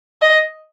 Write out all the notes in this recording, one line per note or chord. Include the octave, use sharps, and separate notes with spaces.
D#5